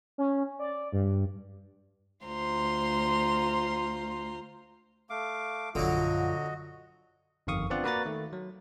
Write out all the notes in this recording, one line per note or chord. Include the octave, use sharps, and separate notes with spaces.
C#4
D5
G2
D2 F4 C5 A#5 C6
A3 F5 D6
A#1 F#2 D3 F#3 F4 F#4 D#5
G1 F2 D#3 F5 C#6 D#6
B3 C4 D4 F4 D5 F#5
A#3 F#4 B4 D5 A#5 A6
D#3 A3
F#3